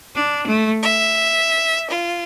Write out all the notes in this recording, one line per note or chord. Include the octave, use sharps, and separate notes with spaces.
D4
A3
E5
F4